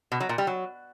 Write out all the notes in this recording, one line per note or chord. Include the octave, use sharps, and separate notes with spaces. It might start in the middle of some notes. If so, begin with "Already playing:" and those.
B2
F#3
A#2
G3
F#3